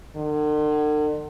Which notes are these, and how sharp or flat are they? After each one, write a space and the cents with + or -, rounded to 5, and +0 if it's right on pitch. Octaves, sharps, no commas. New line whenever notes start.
D3 +45